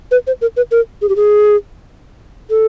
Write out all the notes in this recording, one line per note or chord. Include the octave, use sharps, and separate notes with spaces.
B4
C5
A#4
B4
A#4
G#4
G4
G#4
A4